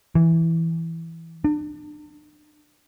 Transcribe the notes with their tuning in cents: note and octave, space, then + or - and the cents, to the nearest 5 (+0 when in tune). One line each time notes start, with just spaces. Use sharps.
E3 +0
D4 +35